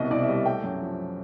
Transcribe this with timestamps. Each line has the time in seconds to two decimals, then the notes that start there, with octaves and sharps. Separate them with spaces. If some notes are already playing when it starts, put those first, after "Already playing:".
Already playing: C2 B2 D#5
0.11 C2 D5
0.23 E5
0.28 G3 D#5
0.46 A3 G5
0.64 F#2
0.82 F3